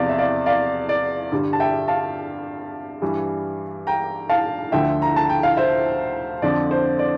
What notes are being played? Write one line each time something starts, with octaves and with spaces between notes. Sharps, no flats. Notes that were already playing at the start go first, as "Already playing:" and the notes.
Already playing: E2 C3 F3 D5 F5
E5
D5 F5
D5 F5
D5
G2 D3 G3
A5
E5 G5
F5 A5
G2 E3 G3
G5 A#5
F5 A5
D2 D3 F3 E5 G5
A#5
A5
G5
F5
C5 E5
F2 D3 F3 D5
C5
D5